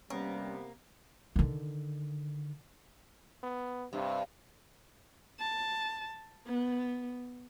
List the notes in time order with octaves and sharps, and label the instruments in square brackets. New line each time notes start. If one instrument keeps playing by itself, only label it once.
[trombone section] C3 B3 [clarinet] G3 [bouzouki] A#3 [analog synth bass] C#4
[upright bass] D3 D#3
[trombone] B3
[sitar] G2 [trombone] C3
[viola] A5
B3